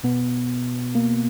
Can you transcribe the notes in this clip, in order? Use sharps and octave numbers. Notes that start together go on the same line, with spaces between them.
B2 B3
A#3